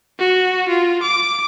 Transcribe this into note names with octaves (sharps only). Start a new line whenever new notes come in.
F#4
F4
D6